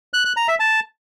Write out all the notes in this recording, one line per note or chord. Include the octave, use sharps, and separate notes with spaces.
F#6
F#6
A#5
E5
A5